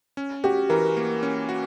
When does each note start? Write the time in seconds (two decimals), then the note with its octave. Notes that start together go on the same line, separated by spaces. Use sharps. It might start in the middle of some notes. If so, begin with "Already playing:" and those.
0.17 C#4
0.44 F#4 G4
0.69 E3 A#4
0.97 A#3
1.23 C#4
1.49 F#4